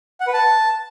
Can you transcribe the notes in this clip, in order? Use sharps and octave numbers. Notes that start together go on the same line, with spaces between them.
F#5
B4
A5